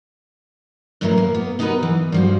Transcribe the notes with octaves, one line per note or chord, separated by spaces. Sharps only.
F#2 A2 E3 F#3 E4 A#4
A#3
B3
B3 D#4 F#4 G#4 A#4 B4
E3
G2 F3 F#4